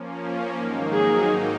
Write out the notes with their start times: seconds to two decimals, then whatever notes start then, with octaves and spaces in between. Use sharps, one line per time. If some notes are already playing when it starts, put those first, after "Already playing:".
Already playing: F3 A#3 C#4
0.55 G#2 D#3 F#3 A#3 D#4
0.93 G#4